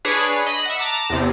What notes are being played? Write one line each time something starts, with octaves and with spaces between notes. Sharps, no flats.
D4 G#4 B4 C#5
D#5 B5
E5 F#5
A5 A#5 D6
E2 C3